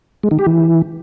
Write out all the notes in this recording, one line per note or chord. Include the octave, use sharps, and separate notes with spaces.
G#3
D#3
G4
E3